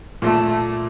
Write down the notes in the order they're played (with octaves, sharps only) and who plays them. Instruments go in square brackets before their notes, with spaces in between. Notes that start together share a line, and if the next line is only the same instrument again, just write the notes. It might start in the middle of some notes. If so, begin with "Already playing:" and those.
[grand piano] A#2 [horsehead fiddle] A3